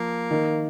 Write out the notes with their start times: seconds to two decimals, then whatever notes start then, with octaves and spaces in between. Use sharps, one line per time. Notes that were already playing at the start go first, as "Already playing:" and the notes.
Already playing: F3 A#3
0.31 D#3